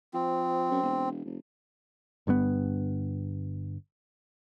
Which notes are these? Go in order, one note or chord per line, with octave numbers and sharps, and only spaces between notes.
F3 C4
F#2
E1
F1
G1 G2 D3 B3